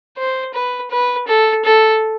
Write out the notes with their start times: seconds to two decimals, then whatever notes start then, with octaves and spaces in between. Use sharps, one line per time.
0.18 C5
0.54 B4
0.91 B4
1.27 A4
1.65 A4